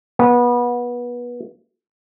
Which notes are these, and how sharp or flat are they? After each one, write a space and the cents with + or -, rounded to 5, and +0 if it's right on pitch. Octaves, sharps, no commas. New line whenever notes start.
B3 -25